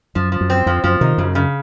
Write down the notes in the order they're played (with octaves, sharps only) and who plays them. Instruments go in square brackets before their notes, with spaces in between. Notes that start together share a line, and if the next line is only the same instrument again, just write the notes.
[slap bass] F#2 [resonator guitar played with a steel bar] F3
[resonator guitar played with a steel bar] F3
[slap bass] F#2
[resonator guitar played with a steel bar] C4
[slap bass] F2 [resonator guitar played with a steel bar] F3
[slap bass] F#2 [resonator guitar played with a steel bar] F3
[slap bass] C3 D#3 [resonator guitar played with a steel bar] D#4
[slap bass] F#2 [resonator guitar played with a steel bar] C#3
[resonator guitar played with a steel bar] C#3